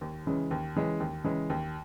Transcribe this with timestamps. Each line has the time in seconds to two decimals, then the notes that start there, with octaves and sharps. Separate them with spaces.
0.01 D#2
0.26 C#3 E3 G#3 C#4
0.51 D#2
0.75 C#3 E3 G#3 C#4
1.00 D#2
1.24 C#3 E3 G#3 C#4
1.50 D#2